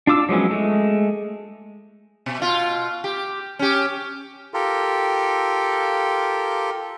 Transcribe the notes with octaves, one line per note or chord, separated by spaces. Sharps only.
D4 F4 D6 E6
F3 F#3 G#3 B3 C#4
G#3 A3
B2
B2 F4
G4
C#4 G4
F4 G4 A4 A#4